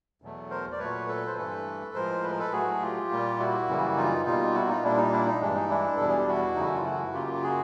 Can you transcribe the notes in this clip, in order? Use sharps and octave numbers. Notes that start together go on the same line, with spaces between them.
E2 B2 F#3 A3
A#4 C5
D5
A#2 F#3 A3 B4 C#5
A4 B4
C5
G2 E3 A3 A4 B4
A2 F3 G#3 A#4 C5
B4
A#4
A4 B4
A2 F#3 A3 F#4 G#4
F4 G4
A#2 G3 A#3
E4 F#4
F#2 C#3 E3 G3 A#3
D#4 F4
B2 G3 A#3 D#4 F4
E4 F#4
D#4 F4
A#2 G3 A#3 D4 E4
D#4
D4 E4
D#4
G2 E3 G#3 D4
D#4
D4 E4
E2 B2 G3 A4
G#4
G4
E4 F#4
F#2 C#3 E3 A3 D#4
E4
F4
E4 F#4
F#2 C#3 F#3 A#3 F4 G4
G4
F#4 G#4